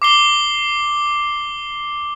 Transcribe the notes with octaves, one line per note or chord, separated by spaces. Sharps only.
D6 C7 G7